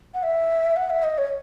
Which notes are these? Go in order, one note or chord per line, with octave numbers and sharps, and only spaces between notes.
F#5
E5
F#5
E5
D#5
C#5